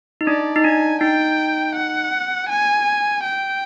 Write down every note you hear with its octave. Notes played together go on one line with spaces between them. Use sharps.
D#4
D4 D5
D#4
D4 G#5
D#4 G5
F#5
G#5
G5